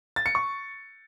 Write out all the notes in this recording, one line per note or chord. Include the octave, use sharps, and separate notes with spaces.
A6
C#7
C#6